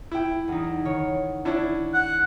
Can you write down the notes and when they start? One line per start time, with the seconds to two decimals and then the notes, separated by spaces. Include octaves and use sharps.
0.12 E4 G5
0.48 E2 D#4
0.85 D#3 C#5
1.45 C#4 D4 E4
1.94 F#5